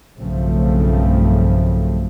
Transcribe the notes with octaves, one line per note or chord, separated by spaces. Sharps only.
B1 G2 C#3 F3 A3 C4